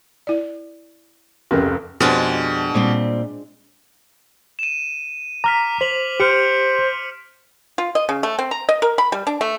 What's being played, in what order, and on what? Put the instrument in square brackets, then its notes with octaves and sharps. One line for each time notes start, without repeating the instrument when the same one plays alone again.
[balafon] E4 D5
[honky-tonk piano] F1 C#2 [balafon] C#4 G4 A#4
[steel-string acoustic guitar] F2 G4 G#5 [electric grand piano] B2 [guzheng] G#3 D4 F4
[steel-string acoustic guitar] A#2 G3 C4
[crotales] D#7 E7
[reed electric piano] A#5 [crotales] D6 F6 B6
[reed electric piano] C5 [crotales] B6 F7 F#7
[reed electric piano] G4 [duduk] C5 [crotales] F6 C#7 D7
[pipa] F4
D#5
C#3
A3
C4
A#5
D#5
A#4
B5
G3
D4
A3